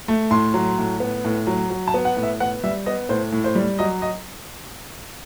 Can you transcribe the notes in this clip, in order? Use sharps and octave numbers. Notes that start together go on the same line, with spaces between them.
A3
A2 C6
F#3
A2
B3
A2
F#3
F#3
A5
B3
F#5
A2
E5
B3 F#5
G3 E5
B3 D#5
A2 C5
A2
C5
G3
F#3 D#5
D#5